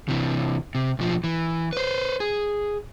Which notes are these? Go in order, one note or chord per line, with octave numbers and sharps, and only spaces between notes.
C3 E3
C3
B1 F3
E3
B4 C5
G#4